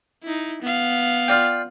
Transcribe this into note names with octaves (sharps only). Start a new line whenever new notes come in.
D#4 E4
B3 F5
F4 D5 G5